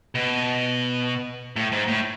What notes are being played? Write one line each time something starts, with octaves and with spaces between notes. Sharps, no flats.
B2
A2
G#2
A2